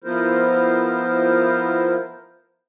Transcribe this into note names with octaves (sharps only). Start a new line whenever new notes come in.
F3 B3 E4 F4 A#4 C5